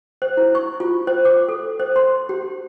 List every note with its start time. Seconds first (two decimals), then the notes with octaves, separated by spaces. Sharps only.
0.22 C5
0.37 E4
0.55 C#6
0.80 F4
1.07 C5
1.25 D6
1.49 A4
1.80 C5
1.96 C6
2.29 G4